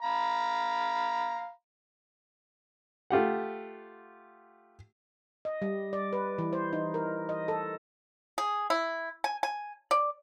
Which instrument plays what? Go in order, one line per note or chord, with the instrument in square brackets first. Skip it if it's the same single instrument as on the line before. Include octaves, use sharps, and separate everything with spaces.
[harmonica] F5 A#5 B5
[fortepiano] A3 F4 G4 F#5
[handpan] D#5
G3
D5
B4
E3
C5
D#4
A#4
D#5
A4
[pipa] G#4
E4
G#5
G#5
D5